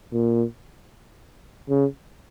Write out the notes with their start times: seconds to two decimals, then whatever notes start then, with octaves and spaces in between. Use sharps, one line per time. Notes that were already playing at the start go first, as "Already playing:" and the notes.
0.12 A#2
1.69 C#3